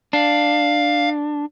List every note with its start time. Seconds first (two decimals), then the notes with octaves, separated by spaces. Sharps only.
0.13 D4 F5